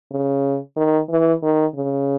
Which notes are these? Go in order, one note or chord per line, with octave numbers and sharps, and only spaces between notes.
C#3
D#3
E3
D#3
C#3